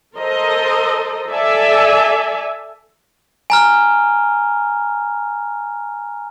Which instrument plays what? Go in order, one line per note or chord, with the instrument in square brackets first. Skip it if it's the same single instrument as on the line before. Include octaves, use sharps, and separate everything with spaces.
[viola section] A4 A#4 C5 D#5
A4 D5 E5 G#5
[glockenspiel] G#5 A#5 F6